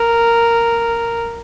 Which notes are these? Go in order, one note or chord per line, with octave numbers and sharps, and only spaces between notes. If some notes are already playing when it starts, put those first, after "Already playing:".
Already playing: A#4